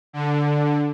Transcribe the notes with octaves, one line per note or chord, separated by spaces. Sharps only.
D3